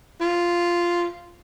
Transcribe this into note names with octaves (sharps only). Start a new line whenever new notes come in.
F4